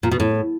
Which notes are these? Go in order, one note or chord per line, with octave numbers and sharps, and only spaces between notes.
A#2
B2
A2